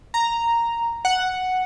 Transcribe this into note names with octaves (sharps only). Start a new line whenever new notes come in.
A#5
F#5